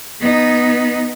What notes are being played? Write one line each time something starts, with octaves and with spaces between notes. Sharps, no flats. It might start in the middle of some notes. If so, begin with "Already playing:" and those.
B3 D#4